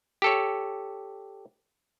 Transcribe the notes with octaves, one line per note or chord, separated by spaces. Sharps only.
G4 A4 C#5